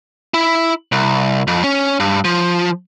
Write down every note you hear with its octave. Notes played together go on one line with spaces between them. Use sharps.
E4
C2
F2
C#4
G2
F3